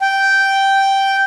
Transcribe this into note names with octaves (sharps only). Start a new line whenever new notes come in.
G5